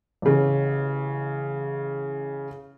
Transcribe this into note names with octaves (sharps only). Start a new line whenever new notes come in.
A1 C#3